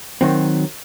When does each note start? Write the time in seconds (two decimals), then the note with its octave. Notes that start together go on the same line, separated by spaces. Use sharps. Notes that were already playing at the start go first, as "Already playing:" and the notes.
0.21 D#3 F#3 C4